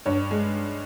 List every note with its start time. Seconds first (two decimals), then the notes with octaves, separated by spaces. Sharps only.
0.06 G2 C#5
0.31 G#3